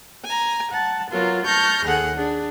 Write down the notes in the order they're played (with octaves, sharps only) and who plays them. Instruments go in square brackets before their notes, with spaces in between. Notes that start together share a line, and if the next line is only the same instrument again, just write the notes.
[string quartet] G#5 A#5
F#5 A5
F#3 B3 F4 A#4
A5 C#6 F6 G6 A#6
D#2 G#4 A4 F#5
D4 G#4